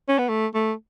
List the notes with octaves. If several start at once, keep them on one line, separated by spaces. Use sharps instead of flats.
C#4
B3
A3
A3